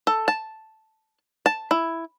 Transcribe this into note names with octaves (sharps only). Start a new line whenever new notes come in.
A4
A5
A5
E4